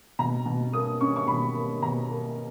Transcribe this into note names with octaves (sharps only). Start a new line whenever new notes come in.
B2 A#5
B2
A#3 D#6
C#4 C#6
C#6
B2 B5
A#3
B2 A#5
A#3